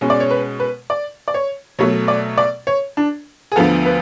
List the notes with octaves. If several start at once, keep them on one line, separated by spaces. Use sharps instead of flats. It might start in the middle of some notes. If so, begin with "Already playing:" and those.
B2 G#3 C#4
D5
C#5
B4
B4
D5
D5
C#5
B2 F#3 A3 C#5
D5
D5
C#5
D4
G#4
D2 D3 F3 B3 A4
B4